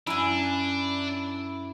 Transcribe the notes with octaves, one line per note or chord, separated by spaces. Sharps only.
F#2 D4 E4 G#5